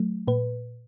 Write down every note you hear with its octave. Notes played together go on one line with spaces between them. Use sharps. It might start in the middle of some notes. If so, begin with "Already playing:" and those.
Already playing: F#3 A3
A#2 B4